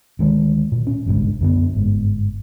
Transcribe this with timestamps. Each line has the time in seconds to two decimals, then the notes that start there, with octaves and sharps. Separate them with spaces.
0.19 D2 D#3 G#3
0.72 A#2
0.87 C#4
1.06 G1 C2 G#2 D3
1.41 F#2 D3 B3
1.75 G1 G#2